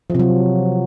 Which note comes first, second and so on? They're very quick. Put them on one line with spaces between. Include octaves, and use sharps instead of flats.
F3 C3 F#3